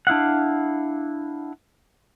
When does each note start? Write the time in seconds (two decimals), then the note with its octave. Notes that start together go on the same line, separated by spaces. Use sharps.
0.07 D4 E4 F5 F#5